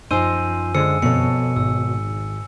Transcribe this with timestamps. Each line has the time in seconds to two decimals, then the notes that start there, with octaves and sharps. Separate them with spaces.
0.11 F#2 F3 D#4 C5 G#5 E6 D#7
0.75 D3 G#3 C5 E6 C#7
1.02 F2 B2 A4 C#5 C#7
1.56 G#1 G#2 E6